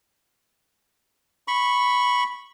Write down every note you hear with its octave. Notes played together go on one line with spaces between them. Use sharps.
B5 C#6